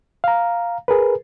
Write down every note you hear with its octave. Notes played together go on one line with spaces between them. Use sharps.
F5 A#5
G#4 A#4 B4